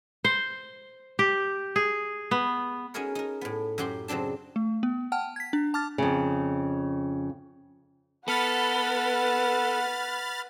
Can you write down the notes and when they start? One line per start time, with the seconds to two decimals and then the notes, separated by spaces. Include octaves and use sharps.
0.25 C5
1.19 G4
1.76 G#4
2.31 B3
2.94 C#4 D#4 F#4 G#4 A#4 C#5
3.15 D#4 A#4
3.41 A2 B3
3.78 F#2 F#3 F#4 G4 C6
4.08 C#3 F#3 C4 D4 A5
4.56 A3
4.83 B3
5.12 F#5 G5 A5 F6
5.36 G#6 B6
5.53 D4
5.74 A5 D6 F6 A6
5.98 F2 C#3
8.28 B3 A4 B4 F#5 B5 F6 A6